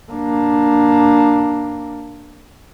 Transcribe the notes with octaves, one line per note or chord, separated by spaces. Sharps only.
A#3 D4